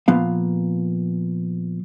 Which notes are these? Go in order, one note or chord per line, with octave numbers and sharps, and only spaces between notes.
A#2 F3 B3 F5